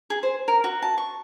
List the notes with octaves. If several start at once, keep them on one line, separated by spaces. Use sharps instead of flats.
G#4
C5
A#4
F#4
A5
C#6